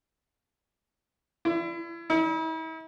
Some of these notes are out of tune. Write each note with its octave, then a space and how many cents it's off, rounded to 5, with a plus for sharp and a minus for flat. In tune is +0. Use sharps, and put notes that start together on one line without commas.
E4 +35
E4 -45